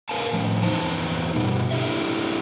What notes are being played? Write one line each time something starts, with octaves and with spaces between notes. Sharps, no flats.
A#4 B4 F5 G#5 A5
A2 F3
E2 B3 D#4 C5 A5
G2 B2 G3
D4 E4 G4 A4 E5